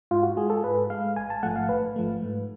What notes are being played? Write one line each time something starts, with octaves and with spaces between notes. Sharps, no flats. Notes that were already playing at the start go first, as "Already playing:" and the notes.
G#2 F4
F#4
G#3 G#4
A4
G#2 B4
G#3 F5
A1 G#5
A5
G#2 F3 A3 F#5
F5
A1 B4
G#2 F3 A3
G#2